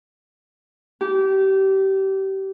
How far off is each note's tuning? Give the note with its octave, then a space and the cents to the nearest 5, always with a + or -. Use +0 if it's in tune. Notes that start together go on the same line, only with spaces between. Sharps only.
G4 -25